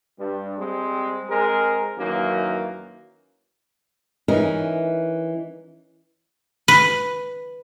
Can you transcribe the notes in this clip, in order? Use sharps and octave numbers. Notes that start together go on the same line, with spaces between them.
G2 G3
G3 G#3 C4
G#3 C4 A#4
F#2 D#3 E3 A#3
E3 C#4 D#4 A#4
B4